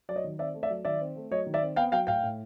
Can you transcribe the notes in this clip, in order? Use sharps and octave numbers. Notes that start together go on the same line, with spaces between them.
F#3 D5
C#5 D#5
D#3
C4 D5 E5
A3
D5 E5
F#3
D#3 D5 E5
C4
A3
F#3 C#5 D#5
D#3
D5 E5
C4
B3 F5 G5
F#3 F5 G5
A2 F5 G5
A2